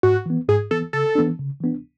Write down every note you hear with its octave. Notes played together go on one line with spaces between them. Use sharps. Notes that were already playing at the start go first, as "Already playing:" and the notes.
G#2 F#4
E3 B3
G#2 G#4
E3 B3 A4
C#3 A4
E3 B3 D4
C#3
E3 B3 D4